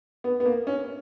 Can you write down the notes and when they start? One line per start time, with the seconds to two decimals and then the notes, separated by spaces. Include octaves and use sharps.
0.24 B3
0.40 B3
0.46 A#3
0.67 C#4